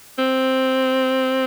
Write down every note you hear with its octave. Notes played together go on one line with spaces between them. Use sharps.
C4